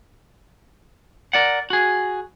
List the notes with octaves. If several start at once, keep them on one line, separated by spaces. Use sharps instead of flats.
A#4 D5 F#5
F#4 G#4